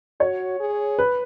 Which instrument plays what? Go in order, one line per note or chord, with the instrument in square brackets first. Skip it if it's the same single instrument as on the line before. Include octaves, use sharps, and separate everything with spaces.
[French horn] F#4 [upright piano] C#5
[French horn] G#4
[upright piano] B4